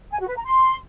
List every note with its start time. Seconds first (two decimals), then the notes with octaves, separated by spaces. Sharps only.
0.11 G#5
0.20 F#4
0.28 B4
0.36 A#5
0.45 C6